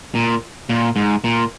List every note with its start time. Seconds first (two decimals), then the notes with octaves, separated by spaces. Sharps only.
0.15 A#2
0.69 A#2
0.96 G#2
1.24 A#2